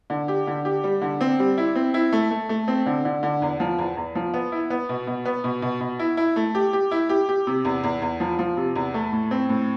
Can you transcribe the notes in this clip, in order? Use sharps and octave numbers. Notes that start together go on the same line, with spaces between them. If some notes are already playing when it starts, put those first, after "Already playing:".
D3
G4
D3
G4
G3
D3
C4
G3
E4
C4
E4
A3
A3
A3
C4
D3
D3
D3
E2
F3
E2
E2
F3
B3
E4
B3
B2
B2
B3
B2
B2
B2
E4
E4
A3
G4
G4
E4
G4
G4
C3
E2
E2
E2
F3
F3
C3
E2
A3
A2
C4
A2